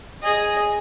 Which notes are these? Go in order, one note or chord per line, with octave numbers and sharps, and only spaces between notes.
G#4 D#5